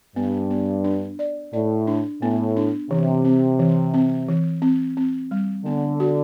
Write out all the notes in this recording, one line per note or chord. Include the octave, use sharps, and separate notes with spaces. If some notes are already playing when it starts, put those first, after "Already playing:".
G2 B3
B3
D4
D5
A2 D5
D4
A2 B3
D4
C3 E3
C4
E3
C4
E3
C4
C4
G3
D3 B3
F#4